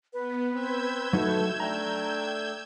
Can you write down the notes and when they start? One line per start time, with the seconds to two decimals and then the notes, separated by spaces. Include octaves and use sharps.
0.13 B3 B4
0.53 C4 E6 G6 G#6
1.13 F#3 A3 D#4 F#4 A4
1.60 A3 D4 G5 A#5